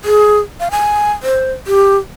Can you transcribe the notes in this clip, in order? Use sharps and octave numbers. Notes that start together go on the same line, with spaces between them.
G#4
F5
G#5
C5
G4